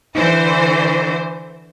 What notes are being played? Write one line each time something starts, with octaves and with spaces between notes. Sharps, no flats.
D3 E3 C5